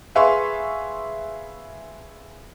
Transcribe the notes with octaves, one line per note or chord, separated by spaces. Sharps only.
G#4 B4 E5 F5 C6 C#6